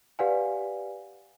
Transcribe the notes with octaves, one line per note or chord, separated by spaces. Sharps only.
G4 B4 D5 F5 F#5 G#5